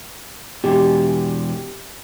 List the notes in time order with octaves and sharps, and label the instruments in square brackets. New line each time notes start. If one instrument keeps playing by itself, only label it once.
[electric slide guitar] E2 B2 [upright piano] G4